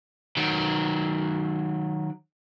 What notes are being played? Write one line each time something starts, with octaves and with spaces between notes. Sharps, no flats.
D#3 F#3